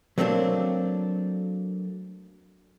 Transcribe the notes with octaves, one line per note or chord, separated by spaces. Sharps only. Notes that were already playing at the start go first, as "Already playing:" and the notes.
F#3 A3 A#3 C4 D4